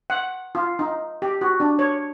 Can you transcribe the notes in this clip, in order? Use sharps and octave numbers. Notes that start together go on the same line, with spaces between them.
F#5
F4
D#4
G4
F#4
D4
C#5